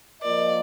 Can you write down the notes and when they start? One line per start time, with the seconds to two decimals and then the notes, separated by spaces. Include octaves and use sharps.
0.22 F3 A#3 F4 A#4 D5 D#5